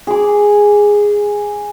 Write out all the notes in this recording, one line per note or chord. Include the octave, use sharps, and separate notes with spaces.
G#4 D6